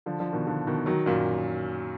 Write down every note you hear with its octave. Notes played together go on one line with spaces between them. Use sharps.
D3 F3
D3 F3
B2 D#3
D3 F3
B2 D#3
D#3 F#3
F#2 A#2